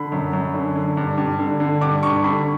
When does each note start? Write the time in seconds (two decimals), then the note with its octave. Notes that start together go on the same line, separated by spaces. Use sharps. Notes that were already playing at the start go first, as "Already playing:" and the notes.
Already playing: D3 B5
0.12 F#2
0.33 F#2
0.54 D3
0.76 D3
0.97 G2
1.18 G2
1.39 D3
1.60 D3
1.81 G2 D6
2.03 G2 C#6
2.24 D3 B5